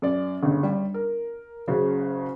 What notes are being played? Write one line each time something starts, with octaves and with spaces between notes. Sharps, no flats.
F#2 D5
G1 C#3
G3
A#4
F#1 C#3 F#4 G#4